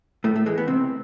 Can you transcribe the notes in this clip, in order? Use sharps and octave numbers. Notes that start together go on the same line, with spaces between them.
A2 A3
A3
E3 G#3
B3
C3 C4